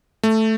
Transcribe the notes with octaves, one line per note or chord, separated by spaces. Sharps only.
A3